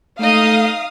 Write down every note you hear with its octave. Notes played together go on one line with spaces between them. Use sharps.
A3 D#4 D#5 F5 D#6